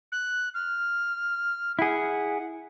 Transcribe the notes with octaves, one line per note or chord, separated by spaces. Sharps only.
F#6
F6
E4 G#4 F#5